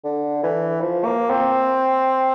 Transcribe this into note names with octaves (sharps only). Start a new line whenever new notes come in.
D3
E3
F3
A#3
C4